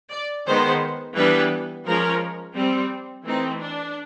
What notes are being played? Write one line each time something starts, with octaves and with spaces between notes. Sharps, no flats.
D5
D#3 G#3 B3 C5
E3 G3 B3 D4 B4
F3 G#3 C#4 A#4
G3 C4
E3 A3 C4 D#4
D4